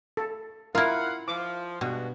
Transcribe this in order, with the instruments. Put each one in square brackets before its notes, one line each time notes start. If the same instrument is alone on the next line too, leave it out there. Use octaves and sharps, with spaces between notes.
[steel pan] A4
[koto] E4 F4 [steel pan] A#4 [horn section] F5 F#5
[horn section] F3 [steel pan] D6
[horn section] G2 G#3 F#4 [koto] B2